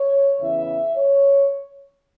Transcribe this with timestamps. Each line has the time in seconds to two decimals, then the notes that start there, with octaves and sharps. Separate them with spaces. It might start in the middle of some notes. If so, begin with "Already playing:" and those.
Already playing: C#5
0.40 E2 C#3 E3 E5
0.96 C#5